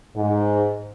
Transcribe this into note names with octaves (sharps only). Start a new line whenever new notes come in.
G#2